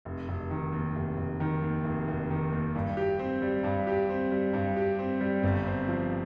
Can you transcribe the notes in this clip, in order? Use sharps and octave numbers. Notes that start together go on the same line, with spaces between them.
F1
F1
D#3
D#2
F1
F1
D#3
D#2
F1
F1
D#3
D#2
G2
G4
C4
G3
G2
G4
C4
G3
G2
G4
C4
G3
G1
C4
F3